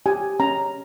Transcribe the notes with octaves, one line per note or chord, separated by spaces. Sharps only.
G4 G#5
C#4 A#5